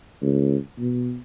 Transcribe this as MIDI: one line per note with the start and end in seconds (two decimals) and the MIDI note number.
0.22 0.56 37
0.78 1.19 47